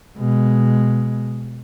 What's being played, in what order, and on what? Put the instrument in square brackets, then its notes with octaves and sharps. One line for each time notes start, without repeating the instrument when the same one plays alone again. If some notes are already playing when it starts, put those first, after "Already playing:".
[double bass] B2 G#3